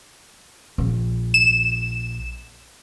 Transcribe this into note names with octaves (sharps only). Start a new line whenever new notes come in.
A#1
E7